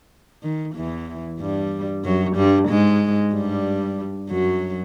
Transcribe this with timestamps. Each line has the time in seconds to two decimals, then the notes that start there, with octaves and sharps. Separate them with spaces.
0.43 D#3
0.75 E2 E3
1.40 G2 G3
2.04 F#2 F#3
2.36 G2 G3
2.69 G#2 G#3
3.34 G2 G3
4.30 F#2 F#3